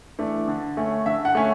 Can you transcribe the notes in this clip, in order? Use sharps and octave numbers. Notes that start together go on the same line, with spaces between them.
E3 A3 D4
D3
A3 C#4
D3 E5
F#5
A3 C#4